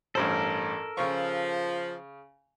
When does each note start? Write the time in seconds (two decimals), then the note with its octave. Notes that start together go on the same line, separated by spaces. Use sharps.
0.15 A1 G2 A4 A#4 C5
0.97 C#3 F3 C#6